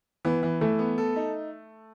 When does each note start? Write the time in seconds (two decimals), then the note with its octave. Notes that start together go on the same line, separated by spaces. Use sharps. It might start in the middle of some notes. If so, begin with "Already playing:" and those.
0.25 E3 B3
0.43 E3
0.61 E3 A3
0.79 B3
0.98 A4
1.16 D#4